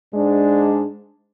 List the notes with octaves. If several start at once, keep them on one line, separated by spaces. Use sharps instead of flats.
G#2 G#3 D4